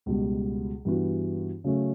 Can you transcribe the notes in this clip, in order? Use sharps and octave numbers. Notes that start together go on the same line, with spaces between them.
C#2 B2 G3
G2 E3 B3 F#4
C#3 F#3 A3 C#4